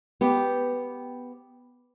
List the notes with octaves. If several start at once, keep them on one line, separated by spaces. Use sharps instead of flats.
B3 G4